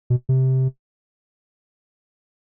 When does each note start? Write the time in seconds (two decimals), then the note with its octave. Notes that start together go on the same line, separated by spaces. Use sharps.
0.10 B2
0.29 C3